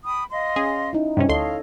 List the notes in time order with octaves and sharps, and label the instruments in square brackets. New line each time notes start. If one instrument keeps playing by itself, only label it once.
[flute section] G5 B5 D#6
D#5 F5 C6
[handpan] C#4 [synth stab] G#4
[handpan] D#4 E4
[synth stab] G2 C3 C#4
[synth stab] D2 C6 [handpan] A4 C#5 D#5 [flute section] F5